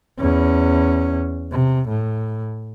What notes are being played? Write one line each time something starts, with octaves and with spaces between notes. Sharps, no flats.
E2 C#4
C3
A2